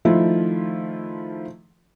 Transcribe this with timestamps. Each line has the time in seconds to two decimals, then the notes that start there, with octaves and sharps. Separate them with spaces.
0.05 D#3 F3 A3 E4 F4